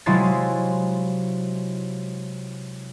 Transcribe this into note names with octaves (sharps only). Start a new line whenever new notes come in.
C3 F#3 G#3 E4 F4 A6